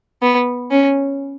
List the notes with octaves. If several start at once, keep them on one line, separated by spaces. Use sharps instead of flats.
B3
C#4